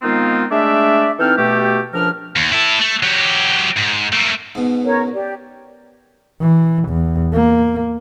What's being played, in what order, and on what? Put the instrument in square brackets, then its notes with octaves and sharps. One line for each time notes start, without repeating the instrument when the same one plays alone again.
[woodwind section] D#3 G#3 B3 C4 D#4 F4
G#3 A3 D4 D5 E5
E3 C4 D#4 A4 G5 F6
B2 A3 G4
C#2 F3 D4 A#4 F6
[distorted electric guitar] D#2
E4 A4
A3
F#3 G4
G#2
A3 A#3
[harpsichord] G#2 B2
[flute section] C#4 A#4 C#5
G4 D5
[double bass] E3
E2
A#3